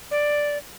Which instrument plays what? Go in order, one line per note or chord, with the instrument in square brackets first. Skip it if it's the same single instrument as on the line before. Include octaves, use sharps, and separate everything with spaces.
[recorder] D5